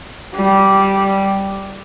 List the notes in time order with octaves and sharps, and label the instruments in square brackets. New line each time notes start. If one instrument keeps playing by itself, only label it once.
[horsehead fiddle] G3